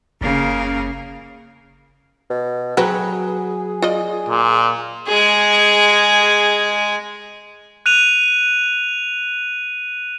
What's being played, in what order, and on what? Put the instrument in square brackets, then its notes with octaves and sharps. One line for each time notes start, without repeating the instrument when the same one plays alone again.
[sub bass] F#1 [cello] C#3 A#3
[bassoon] B2
[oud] F#3 B4 [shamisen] C4 F#4 [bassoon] G#4
[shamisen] F4 D5 D#5
[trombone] A#2
[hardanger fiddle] G#3 G#4
[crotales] F#6 D#7 F7